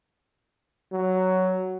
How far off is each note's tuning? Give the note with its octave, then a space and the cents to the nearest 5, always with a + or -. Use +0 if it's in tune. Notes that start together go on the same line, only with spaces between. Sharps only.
F#3 +5